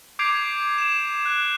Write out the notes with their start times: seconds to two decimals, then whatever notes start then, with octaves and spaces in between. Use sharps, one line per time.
0.19 D6 G6 G#6 C7 D7 F7
0.78 E7
1.26 F#6